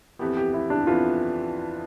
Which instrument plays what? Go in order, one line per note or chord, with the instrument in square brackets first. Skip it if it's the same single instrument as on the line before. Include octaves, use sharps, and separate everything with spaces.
[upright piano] F2 E3 B3 [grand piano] G4
[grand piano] G4
E4
D4
[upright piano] F2 E3 B3 [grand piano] F4